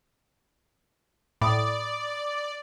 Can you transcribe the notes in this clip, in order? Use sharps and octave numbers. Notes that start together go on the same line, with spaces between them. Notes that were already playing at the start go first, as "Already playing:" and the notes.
A2 D5 B5 D#6